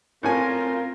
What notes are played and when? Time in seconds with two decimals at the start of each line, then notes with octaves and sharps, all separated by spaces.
0.23 A2 C4 C#4 F4 A#4 G#5